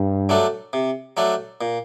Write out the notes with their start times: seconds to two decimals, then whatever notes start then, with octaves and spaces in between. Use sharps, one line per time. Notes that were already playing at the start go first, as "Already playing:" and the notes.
Already playing: G2
0.29 F#3 A3 D4 A4
0.73 C3
1.17 F#3 A3 D4 A4
1.61 A#2